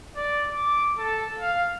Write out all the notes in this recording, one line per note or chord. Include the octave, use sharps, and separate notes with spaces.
D5
D6
A4
F5